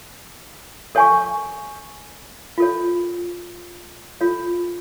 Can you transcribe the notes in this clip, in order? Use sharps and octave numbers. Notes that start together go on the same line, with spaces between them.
A4 C#5 G#5 C#6
F4 A4 C#5
F4 A4 C#5